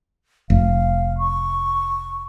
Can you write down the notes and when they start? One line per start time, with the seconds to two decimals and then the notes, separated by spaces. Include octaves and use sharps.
0.50 F1 F5
1.18 C#6